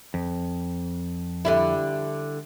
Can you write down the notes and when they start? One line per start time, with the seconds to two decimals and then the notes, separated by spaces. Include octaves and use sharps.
0.14 F2
1.45 D3 G3 E4